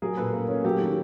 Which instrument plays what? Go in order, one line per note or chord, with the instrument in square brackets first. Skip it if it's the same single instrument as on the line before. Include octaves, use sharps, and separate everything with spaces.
[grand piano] F#3 [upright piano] G#4 A#4
[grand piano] A#2 [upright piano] A4 B4
[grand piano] A#3
C#4
[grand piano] F#3 [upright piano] G4 A4
[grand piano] D#3